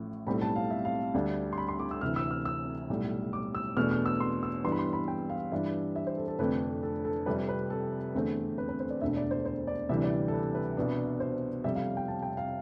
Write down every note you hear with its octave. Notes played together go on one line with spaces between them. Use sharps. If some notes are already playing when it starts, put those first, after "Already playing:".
Already playing: A1 A2 F3
B1 A2 G3 C4 B5
A5
F5
E5
F5
D2 D3 G3 D4
C6
B5
C6
D6
E6
D2 C3 E3 F6
E6
F6
E6
B1 A2 G3
D6
E6
E2 B2 A3 D4 F6
F6
E6
C6
E6
G2 E3 G3 B3 C6
B5
C6
B5
G5
F5
G2 E3 G3 D4 E5
E5
C5
A4
A4
F1 F2 D3 A3 D4 B4
A4
A4
F1 F2 C3 G3 B4
B4
A4
E2 D3 A3 C4
B4
B4
C5
D5
E1 D2 D3 A3 E5
D5
C5
C5
D5
D2 C3 E3 G3 D4 E5
D5
A4
B4
B4
C2 B2 B3 D4
C5
F1 F2 C3 G3 E5
F5
G5
A5
G5
F5